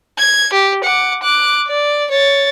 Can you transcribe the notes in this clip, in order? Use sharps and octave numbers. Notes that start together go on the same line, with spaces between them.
G#6
G4
F#5 D6
D6 F#6
D5
C#5 A6